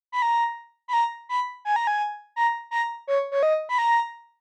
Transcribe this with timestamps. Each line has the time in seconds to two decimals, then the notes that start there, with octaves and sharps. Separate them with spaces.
0.12 B5
0.22 A#5
0.88 B5
0.93 A#5
1.29 B5
1.65 G#5
1.76 A#5
1.87 G#5
2.36 A#5
2.71 A#5
3.07 C#5
3.32 C#5
3.43 D#5
3.69 B5
3.78 A#5